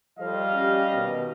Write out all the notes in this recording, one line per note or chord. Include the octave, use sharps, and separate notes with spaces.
F3 G3 A4 C5 D#5 F5
C#4 G4
B2 D#3